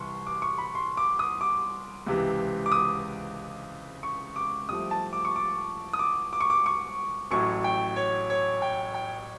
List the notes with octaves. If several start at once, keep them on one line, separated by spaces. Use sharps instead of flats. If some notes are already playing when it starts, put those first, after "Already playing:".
Already playing: C2 C3 E3 C6 C#6
D6
C#6
B5
C6
D6
D#6
D6
C#2 C3 E3
D6
D#6
C#6
D6
C2 C3 F3 A3 D#6
A5
D6
C#6
D6
D#6
D6
D6
C#6
D6
C#6
A1 A2 F#3 A3 C#6
G5
C#5
C#5
G5
G5